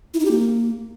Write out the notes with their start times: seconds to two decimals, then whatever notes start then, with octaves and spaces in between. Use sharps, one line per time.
0.14 E4
0.20 D#4
0.25 G4
0.31 A#3